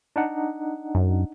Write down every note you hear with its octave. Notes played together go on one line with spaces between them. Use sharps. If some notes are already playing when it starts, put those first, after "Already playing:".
D4 D#4 F#5
F#2